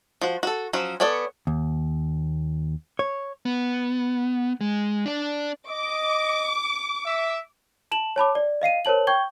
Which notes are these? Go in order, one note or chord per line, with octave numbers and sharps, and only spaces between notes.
F3 F#4
F#4 A4
F3 F#3 C#4 F#4
B3 A4 C#5 D5 G#5
D#2
C#5
B3
G#3
D4 D5
D#5 D6
E5
A5 E7 F#7
C#5 A5 B5 D6
D5
D#5 F5 C7 D#7
A#4 C5 C#5 A5 F#7
G5 C#6 G6 G#6 G7